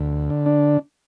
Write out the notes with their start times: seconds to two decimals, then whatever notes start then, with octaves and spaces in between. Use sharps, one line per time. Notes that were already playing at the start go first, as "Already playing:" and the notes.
Already playing: D2
0.30 D3
0.46 D4